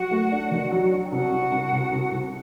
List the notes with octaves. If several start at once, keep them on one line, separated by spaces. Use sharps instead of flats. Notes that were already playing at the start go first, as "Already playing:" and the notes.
Already playing: F#3 F#4 F#5
A3
D4
D#3
F#3
D4
G5
C2 F#4 F#5
C2
C2
C2
C2
C2